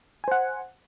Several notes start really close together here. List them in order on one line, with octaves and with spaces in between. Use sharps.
G#5 C5 F#5